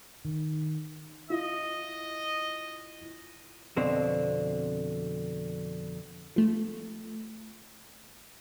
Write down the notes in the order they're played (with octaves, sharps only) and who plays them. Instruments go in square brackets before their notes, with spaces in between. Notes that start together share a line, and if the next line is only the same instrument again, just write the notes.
[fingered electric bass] D#3
[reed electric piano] E4 F4 [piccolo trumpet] D#5
[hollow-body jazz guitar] F2 B2 D3 C4
[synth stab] F3 A3